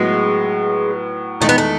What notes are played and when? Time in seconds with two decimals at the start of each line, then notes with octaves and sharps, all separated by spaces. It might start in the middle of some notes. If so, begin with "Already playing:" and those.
Already playing: A2 F#3 G#3 B3
1.40 E2 D#3 G#3 A3 D#4
1.49 B3
1.58 A3